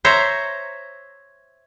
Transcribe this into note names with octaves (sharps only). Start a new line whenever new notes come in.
C5 C#5 E5 A#5